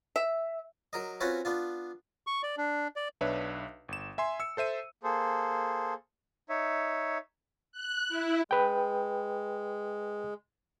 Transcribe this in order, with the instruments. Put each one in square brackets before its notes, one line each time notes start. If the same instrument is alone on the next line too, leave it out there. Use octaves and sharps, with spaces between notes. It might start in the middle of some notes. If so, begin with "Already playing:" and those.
[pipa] E5
[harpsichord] F#3 A#4 D#5
C4 C#4 F4 F#4 B4 C#5
B3 D4 F4
[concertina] C#6
D5
D4
D5
[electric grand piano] B1 D4 B4 C#5 E5
G1 E7
E5 G#5 C6
E6 C#7
A4 C5 E5 D#7
[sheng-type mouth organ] A#3 G#4 A4 C5
D#4 C#5 E5
[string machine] F#6
E4
[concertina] G#3 [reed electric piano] B4 G5